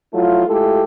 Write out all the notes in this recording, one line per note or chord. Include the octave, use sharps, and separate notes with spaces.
F3 F#3 A3 E4 F4
G#3 A3 E4 F4 G4 A4